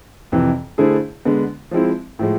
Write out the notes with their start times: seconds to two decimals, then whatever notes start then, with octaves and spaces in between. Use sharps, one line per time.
0.32 F2 C3 E3
0.78 D3 A3 E4 G#4 C5
1.25 D3 G#3 B3
1.71 F3 G#3 C4 E4
2.19 A2 F3 G#3